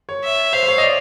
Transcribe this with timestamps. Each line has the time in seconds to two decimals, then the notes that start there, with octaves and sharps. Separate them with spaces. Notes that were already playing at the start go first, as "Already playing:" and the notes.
0.09 C#5
0.24 E5
0.53 C5 F5
0.63 C5
0.68 C#5
0.78 D#5
0.83 D5